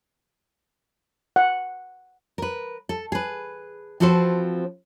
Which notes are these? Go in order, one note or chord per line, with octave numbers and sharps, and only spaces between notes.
F#5
A#4 B4
A4
G#4 B4
F3 C4 F#4 A4 B4 C5